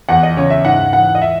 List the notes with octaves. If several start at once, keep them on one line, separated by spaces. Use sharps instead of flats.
E2 F#5
D#5
C#3 C#5
E5
G#2 F#5
E3 F#5
D#5
E5